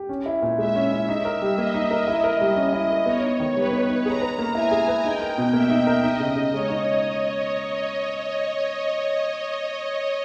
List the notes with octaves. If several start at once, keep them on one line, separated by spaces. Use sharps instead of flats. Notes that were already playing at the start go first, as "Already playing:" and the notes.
Already playing: G4
C#4
E4
A#2
G#3 E5
C#4
E4
D#4 E5
A#4
G3
A#3 D#5
D#4
A#4
E4
A#4
G3
C#4
E4
A#4
B3 C#5
D#4
D#3
G3 B4
B3
D#4
G#4 A#5
B4
A#3
E4 G#5
G#4
B4
D#4 G5
A#4
B2
A#3 E5
D#4
A#4
D#4 D#5
C#3
C#3
G#3 C#5
D#4